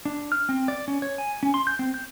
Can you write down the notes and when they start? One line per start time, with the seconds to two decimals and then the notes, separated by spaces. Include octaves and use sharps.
0.05 D4
0.32 F6
0.49 C4
0.68 D5
0.88 C#4
1.02 C#5
1.18 G#5
1.43 C#4
1.54 C6
1.67 G6
1.79 C4
1.94 G6